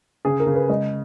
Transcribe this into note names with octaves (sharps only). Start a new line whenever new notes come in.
C#3 G#4
A#4
C#3
B4
G#3 D#5